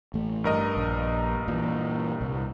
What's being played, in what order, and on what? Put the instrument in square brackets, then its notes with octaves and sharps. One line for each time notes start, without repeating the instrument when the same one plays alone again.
[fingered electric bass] A1 A3
[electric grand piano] G2 A#4 D#5
[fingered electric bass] A#1
A#2 E3
C2